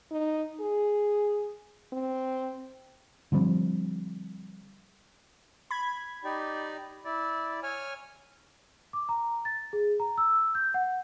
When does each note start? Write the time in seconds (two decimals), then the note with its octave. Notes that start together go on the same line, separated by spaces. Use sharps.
0.11 D#4
0.60 G#4
1.93 C4
3.32 D3 F3 G3 C4
5.71 B5 G#6
6.24 D#4 G4 D5
7.05 E4 D5
7.63 C#5 G#5 F6
8.93 D6
9.09 A#5
9.45 A6
9.73 G#4
10.00 A#5
10.18 E6
10.55 G6
10.74 F#5